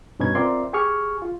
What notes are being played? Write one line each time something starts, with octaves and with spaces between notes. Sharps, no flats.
G2 B2 C#4 D#4 B4 G#6
C4 F4 A#4 D5 E5 C6
G4 G#4 C#6 F6
F4